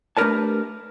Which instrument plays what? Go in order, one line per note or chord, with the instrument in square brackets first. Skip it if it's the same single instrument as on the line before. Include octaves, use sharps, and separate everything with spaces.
[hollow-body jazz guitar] A3 D4 G4 A#4 B4 A5